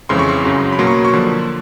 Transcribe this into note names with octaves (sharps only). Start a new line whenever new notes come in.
F2 C#3 E3 G#3 C4 C6
C#6
C6
F#2 C#3 F#3
B5
B2 F#3 A#3 C6
C#6
C#6
D3 F3 A#3 C6